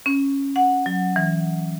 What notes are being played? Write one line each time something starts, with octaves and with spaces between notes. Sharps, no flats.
C#4
F#5
F#3
E3